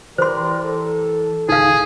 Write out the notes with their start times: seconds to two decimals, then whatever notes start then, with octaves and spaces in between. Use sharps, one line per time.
0.18 E3 G4 A#4 C5 D5 C6
0.63 A4
1.49 D1 G#1 C#2 D#4 G#4 F5